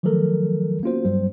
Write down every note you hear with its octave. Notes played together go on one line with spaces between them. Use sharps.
D#3 F3 F#3 A3 A4 A#4
A#3 B3 C#4 F4 F#4 C5
G2 F#3 G3 C5